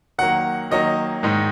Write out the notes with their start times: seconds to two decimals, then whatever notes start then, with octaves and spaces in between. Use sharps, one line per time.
0.18 D#3 F#3 A#3 F#5
0.71 D#3 F#3 A#3 D#5
1.23 G#2 D#3 G#3 D#4